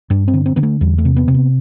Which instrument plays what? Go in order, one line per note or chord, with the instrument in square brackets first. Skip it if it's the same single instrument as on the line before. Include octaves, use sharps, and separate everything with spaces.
[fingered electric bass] G2 D4
C4
D3
C4
D3 B3
A3
E2 G3
A3
C3
B3
C3
B3